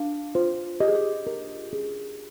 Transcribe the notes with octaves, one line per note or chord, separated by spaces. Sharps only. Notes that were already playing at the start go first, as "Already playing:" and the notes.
Already playing: D4 F5
F4 C5
G4 D#5
G#4
G4
A#4
G#4